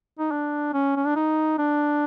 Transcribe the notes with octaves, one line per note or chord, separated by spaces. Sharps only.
D#4
D4
C#4
C#4
D4
D#4
D4